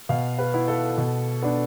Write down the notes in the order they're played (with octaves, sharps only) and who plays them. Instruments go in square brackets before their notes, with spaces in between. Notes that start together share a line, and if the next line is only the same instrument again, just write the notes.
[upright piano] B2 F5
B4
B3 E4
A4
B2
B3 D4